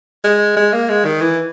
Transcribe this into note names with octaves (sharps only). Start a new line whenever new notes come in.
G#3
G#3
A#3
G#3
D#3
E3